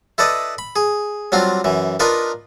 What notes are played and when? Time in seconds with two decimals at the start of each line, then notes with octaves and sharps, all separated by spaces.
0.18 E4 A4 B4 D5 D#5
0.58 B5
0.76 G#4
1.32 F#3 G3 C4 D4 F4
1.64 F#2 E3
2.00 D4 D#4 F4 A#4 B4